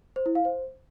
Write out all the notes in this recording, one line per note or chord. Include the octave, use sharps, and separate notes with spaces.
C5
E4
F5
C5